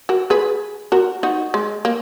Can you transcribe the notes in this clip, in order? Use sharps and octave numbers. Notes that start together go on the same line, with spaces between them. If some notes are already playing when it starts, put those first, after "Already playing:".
F#4 A#4
G#4 B4
F#4 A#4
D#4 F#4
G#3
A#3